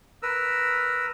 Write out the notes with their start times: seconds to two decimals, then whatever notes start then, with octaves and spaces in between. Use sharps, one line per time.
0.22 A#4 B4 E6